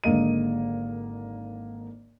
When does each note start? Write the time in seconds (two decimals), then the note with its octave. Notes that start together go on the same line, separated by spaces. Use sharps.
0.04 G#1 G#2 D3 A#3 D#5 D#7